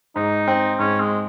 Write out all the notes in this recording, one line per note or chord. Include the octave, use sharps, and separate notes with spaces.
G#2 D#4
C4
G#2 C#4
G#3